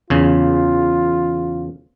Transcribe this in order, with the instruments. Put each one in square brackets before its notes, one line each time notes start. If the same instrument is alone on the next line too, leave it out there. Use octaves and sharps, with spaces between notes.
[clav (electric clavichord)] E2 C#3 [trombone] F4